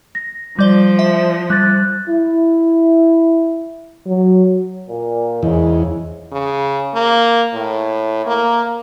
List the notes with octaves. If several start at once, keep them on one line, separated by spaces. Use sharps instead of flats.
A#6
F3 G3 D5 G7
E5
G3 F#6 A6
E4
F#3
A#2
E2 G#2 C#3 G#3
C#3
A#3
A2
A#3